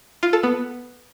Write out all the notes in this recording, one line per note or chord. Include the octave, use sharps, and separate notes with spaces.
F4
A4
B3